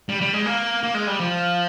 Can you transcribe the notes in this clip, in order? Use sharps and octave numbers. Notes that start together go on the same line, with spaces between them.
G3
G3
G#3
A#3
A#3
G#3
G3
F3